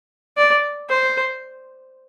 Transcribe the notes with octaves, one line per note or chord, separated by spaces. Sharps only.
D5
C5